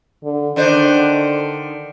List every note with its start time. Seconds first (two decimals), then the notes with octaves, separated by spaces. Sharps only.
0.24 D3
0.56 D3 D#3 D4 C5